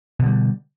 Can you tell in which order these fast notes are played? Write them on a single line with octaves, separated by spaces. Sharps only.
B2 D3 G3